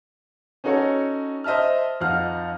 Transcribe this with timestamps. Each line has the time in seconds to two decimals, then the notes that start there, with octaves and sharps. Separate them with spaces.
0.64 C#4 D#4 F#4 A4 C#5
1.44 C5 D#5 E5 A5 F6
2.00 F2 D#4 F5 F#5 F6